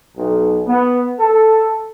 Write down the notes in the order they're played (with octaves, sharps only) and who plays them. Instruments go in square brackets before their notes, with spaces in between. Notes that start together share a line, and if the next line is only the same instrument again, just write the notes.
[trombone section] B1
B3
A4